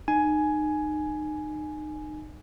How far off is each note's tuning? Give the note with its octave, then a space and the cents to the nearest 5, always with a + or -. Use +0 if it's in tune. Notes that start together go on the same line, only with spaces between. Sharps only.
D#4 -30 G#5 +10